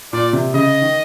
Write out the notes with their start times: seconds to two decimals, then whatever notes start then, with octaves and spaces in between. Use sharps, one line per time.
0.13 A#2 D5
0.33 C3
0.54 C#3 D#5
0.81 D#3